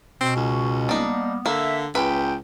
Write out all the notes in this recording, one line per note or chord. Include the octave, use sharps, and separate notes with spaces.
B2 C4
C#2
G3 A#3 B3 D4 D#4
D3 A#3 E5
C#2 B4 G5